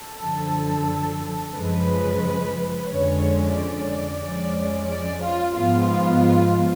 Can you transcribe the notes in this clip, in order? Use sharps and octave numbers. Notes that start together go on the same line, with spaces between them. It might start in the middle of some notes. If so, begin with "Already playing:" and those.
Already playing: A4
F#2 D3 F3
F#2 C#3 F3 G#3 B4
F2 D3 F3 G#3 C#4 C#5
D5
F2 F3 G#3 C#4
D5
F4
G#2 F3 G#3 B3 F4